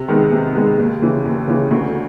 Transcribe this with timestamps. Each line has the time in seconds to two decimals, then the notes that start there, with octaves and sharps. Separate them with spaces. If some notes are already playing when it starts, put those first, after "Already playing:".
Already playing: C3
0.08 D#3 G#3 B3
0.32 C3
0.55 D#3 G#3 B3
0.78 D#2
1.02 C#3 E3
1.25 D#2
1.47 C#3 E3
1.71 D2